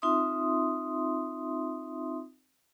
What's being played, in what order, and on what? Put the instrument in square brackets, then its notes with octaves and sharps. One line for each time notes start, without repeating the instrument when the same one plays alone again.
[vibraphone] C4 D#4 F4 E5 C6 D#6